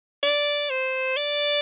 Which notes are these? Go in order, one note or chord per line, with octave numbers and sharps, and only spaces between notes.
D5
C5
D5